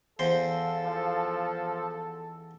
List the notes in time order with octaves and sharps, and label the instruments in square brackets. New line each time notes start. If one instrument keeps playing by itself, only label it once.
[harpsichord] E2 C5 [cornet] A4 [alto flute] F5
[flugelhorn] F3